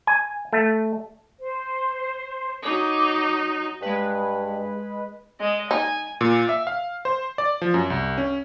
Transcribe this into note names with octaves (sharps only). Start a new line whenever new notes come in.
G#5
A3
C5
F#3 D#4 D6
G2 G#3 B4
G#3 D#5
D#4 G#5
A#2
E5
F5
C5
D5
F3
F#2
C2
C#4